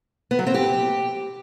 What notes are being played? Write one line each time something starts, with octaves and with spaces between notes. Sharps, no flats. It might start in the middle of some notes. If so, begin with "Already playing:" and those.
B3
F#3
C4
G4